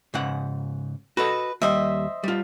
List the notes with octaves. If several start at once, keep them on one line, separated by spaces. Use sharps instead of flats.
G#2 C#3 F#5
F#4 A4 B4 D#5
D#2 G3 C5 D#5 E5
G3 F4